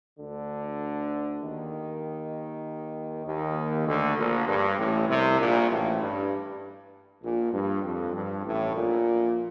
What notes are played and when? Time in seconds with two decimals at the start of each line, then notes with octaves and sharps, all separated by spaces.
0.20 D2 D3
1.41 D#2 D#3
3.25 D#2 D#3
3.86 D2 D3
4.17 A#1 A#2
4.47 G2
4.78 A1 A2
5.08 C2 C3
5.39 A#1 A#2
5.70 A1 A2
6.01 G2
7.23 A#1 A#2
7.53 G2
7.83 F2
8.14 G2
8.45 A1 A2
8.75 A#1 A#2